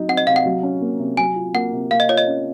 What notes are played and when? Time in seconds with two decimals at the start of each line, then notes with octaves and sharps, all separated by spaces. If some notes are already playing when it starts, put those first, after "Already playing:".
Already playing: F#3 D#4
0.08 C4 F#5
0.17 D#5
0.27 C3 F5
0.36 F#5
0.46 F#3
0.63 C#4
0.81 A#3
0.99 C3
1.17 F#3 G#5
1.36 F4
1.55 A#3 F#5
1.72 C3
1.91 A#3 F5
2.00 D#5
2.09 F4 C#5
2.17 D#5
2.27 C#4